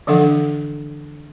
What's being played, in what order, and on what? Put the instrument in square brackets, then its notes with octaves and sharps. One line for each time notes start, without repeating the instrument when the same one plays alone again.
[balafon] D3 E3 F3 D4 A4 F#5